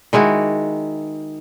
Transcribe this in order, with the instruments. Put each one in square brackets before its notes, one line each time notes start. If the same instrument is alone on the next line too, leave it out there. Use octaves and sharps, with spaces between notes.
[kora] D#3 G#3 E4 F#4